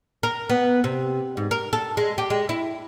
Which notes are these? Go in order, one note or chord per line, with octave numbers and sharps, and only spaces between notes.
A#4
B3
C3
G#2
A#4
A4
G#3
G4
G#3
E4